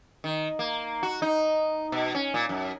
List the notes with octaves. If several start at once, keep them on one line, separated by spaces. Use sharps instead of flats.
D#3
A#3
F#4
D#4
B2
C#4
A#2
F#2